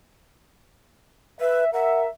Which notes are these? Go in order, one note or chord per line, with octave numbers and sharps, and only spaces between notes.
B4 E5
A#4 E5 F#5